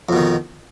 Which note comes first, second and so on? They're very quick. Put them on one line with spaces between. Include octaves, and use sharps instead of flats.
F2 B2 D#3